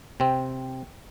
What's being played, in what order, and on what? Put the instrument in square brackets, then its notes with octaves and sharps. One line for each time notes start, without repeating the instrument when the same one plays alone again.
[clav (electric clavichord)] C3 C4 [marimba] G5